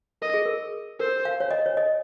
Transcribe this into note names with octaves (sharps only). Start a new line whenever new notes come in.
A#4 D#5
G#4
A#4
A#4 C5
F5
C#5
D#5
C#5
D#5